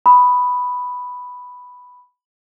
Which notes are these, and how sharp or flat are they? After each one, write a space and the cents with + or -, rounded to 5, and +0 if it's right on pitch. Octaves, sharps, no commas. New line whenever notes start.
B5 +0 D#6 +0